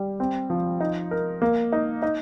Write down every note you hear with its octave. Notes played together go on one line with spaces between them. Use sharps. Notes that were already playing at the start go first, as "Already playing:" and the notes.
Already playing: G3
C4
F3
D#4
A#4
A#3
D#4
D#4